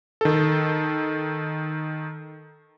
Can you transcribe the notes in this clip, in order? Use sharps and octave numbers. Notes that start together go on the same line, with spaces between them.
D#3 A4